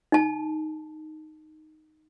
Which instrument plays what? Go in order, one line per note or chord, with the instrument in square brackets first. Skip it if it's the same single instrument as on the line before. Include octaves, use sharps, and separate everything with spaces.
[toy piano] D#4 A5